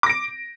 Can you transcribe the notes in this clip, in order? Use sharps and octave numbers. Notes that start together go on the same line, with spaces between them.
D6 A#6 D7